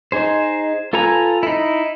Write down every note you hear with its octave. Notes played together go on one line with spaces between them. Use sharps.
D#4 G#4 C5
F4 A4 B4 G#5 A#5
D#4 E4